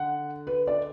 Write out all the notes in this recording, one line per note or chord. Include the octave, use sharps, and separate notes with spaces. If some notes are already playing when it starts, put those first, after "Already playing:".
Already playing: D3 F#5
B4
D5